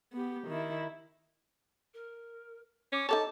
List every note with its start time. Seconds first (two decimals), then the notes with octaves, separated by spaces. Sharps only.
0.13 B3 G4
0.47 D#3 E4
1.94 A#4
2.92 C#4 D6
3.09 D#4 A4 C#5 A5 D6